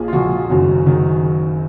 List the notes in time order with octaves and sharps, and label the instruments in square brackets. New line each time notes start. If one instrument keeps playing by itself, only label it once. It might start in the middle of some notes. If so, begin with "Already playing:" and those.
Already playing: [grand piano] A#1 A#2 F3 G#4
F4
A#1 A#2 F3 F#4
F#1 F#2 D#3 F#3
D#3 F#3